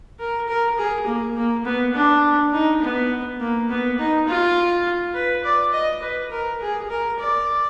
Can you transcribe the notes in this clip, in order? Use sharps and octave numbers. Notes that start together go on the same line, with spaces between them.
A#4
A#4
G#4
A#3
A#3
B3
D4
D#4
B3
A#3
B3
D#4
F4
B4
D5
D#5
B4
A#4
G#4
A#4
D5